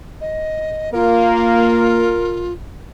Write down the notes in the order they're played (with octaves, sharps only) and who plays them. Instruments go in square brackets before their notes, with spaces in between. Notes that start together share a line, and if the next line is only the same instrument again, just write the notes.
[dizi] D#5
[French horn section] A#3 [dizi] F4 [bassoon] A#4